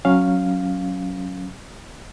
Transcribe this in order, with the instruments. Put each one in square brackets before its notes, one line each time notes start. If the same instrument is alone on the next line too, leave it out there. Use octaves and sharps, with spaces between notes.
[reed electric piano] F#3 C#4 F5